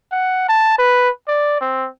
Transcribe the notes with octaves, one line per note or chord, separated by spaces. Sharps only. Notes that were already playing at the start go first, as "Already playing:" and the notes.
F#5
A5
B4
D5
C4